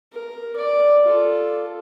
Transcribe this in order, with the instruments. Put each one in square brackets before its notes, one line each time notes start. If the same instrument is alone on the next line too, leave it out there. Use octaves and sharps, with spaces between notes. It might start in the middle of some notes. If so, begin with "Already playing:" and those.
[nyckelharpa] A#4
D5
F4 A4